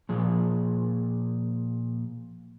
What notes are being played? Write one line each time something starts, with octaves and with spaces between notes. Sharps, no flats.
A#2 F3 G#4